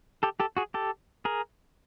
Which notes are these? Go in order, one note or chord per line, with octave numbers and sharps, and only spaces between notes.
G4 A4
G4 A4
F#4 G#4
G4 A4
G#4 A#4